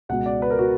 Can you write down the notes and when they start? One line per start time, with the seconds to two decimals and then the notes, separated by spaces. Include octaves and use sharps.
0.09 C#2 B2 F#5
0.26 D5
0.42 B4
0.50 A#4
0.59 F#4